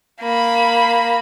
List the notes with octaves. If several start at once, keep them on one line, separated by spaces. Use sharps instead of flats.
A#3 B5